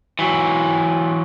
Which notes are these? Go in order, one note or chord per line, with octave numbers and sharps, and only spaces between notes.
E3 F#3